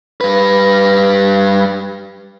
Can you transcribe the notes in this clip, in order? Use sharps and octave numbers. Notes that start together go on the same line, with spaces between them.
G3 B4